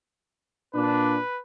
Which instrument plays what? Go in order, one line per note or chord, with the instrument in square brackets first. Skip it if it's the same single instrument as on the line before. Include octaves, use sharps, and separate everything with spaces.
[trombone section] A#2 D4 [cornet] B4